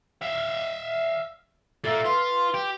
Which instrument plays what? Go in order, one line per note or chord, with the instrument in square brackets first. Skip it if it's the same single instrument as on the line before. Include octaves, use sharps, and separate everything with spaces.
[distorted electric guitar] E5 F5
[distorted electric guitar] A#2 A#3 [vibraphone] A4 E5 E6
[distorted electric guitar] F4 [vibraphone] B4 C6
[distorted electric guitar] G4